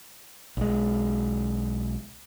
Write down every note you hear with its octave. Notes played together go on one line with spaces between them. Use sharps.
B1 G#3